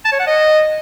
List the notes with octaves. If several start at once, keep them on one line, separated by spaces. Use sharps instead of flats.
A5
C#5
F#5
D#5